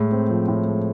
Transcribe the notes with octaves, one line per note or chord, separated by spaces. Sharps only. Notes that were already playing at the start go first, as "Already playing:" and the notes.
Already playing: A2 G#3
C4
F3
A2
G#3